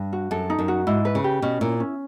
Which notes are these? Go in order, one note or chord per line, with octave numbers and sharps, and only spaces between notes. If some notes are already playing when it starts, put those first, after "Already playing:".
Already playing: G2
F#4
F#2 A4
D#4
F#2
F#4
G#2 E4
B4
C#3
G4
B2 C#4
A#2 E4
C#4